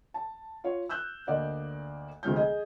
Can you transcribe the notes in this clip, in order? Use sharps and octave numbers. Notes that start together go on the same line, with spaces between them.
A5
F4 C#5
E6 F#6 G6 E7
D2 A#3 D5 D#5 F#5
D2 C3 F3 G#3 F6 G6
G#4 D#5